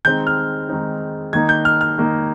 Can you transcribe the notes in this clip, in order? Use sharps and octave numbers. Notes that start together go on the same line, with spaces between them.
D#3 G#3 C4 D#4 G6
F6
D#3 G#3 C4 D#4
D#3 A#3 D#4 G#6
G6
F6
F6
D#3 A#3 D#4